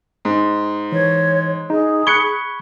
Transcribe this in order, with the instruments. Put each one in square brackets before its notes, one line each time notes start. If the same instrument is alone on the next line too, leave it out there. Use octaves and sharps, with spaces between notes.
[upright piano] G#2
[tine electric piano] E3 [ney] C#5
[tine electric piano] D#4 [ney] G#4
[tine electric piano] B5 C#6 G#6 [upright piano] F#6 C#7 G7